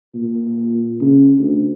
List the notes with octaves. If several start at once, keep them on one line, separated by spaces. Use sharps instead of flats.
A#2
C#3
D2